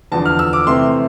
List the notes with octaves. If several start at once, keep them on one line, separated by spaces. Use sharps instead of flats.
E2 D3 F3 A5
F6
E6
D6
C3 E3 A3 C4 C6